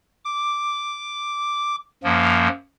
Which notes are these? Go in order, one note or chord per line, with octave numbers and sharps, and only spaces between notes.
D6
F#2 F3 A#3